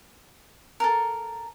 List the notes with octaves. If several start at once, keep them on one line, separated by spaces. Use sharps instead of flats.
A4 A#4